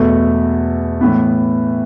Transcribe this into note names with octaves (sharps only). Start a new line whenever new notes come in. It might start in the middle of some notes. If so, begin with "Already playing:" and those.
Already playing: E2 B2 A3
A2 E3 B3